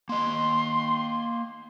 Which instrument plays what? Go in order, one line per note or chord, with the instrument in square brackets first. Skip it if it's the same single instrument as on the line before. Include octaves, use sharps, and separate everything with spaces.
[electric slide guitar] A#3 D#5 [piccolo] C6